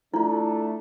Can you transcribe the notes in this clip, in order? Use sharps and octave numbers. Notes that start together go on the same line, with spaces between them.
A3 D4 E4 F4